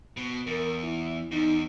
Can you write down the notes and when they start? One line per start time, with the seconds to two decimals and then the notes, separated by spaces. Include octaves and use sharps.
0.17 B2
0.47 E2 A#4
0.83 E4
1.32 E2 D#4